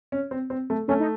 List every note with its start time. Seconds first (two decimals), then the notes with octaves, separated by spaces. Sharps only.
0.12 C#4
0.31 C4
0.50 C4
0.70 A3
0.88 A3 C#4
1.00 D#4